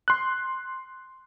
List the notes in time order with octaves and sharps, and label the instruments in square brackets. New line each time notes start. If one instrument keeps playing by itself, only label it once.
[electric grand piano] C6 F#6